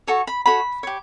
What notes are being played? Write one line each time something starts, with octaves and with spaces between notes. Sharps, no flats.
F#4 A4 C#5 C#6
B5
F#4 A4 C#5 B5
G4 C#5